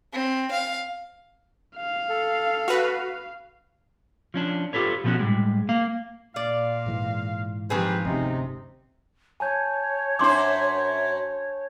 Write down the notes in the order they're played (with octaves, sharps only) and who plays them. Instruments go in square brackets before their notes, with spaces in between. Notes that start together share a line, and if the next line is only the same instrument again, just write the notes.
[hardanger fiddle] C4
F5
[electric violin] F5
[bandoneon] A4
[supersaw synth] F#4 B4
[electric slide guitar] F3 C#4 D4
F4 G4 A4 B4 C#5
B2 F3 A3 B3 C#4 F#4
A2 G3 G#3
A#3 F5
[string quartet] A#2 [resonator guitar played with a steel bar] D5 [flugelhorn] F5
[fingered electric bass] G#2 E3 G#3
[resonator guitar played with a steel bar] D#3 C4 G#4 [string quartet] F3 G4 [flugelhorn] B4
[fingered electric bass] G1 D2 C#4 [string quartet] C3 [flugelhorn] D#4
[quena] C#5 [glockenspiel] G#5 A5 G6
[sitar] F#2 C5 [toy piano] D4 C6 D6